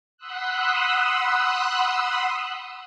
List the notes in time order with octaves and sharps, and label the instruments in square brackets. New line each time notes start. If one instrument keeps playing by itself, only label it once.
[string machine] F#5 B5 C6 D#6 E6 F#6